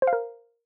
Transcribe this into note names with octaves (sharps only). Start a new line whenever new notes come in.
C5
F5
A#4